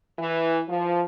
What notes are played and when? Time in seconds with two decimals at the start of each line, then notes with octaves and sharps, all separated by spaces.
0.19 E3
0.69 F3